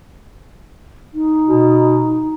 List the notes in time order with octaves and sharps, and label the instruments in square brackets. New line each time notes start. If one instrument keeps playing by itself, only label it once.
[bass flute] D#4
[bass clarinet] B2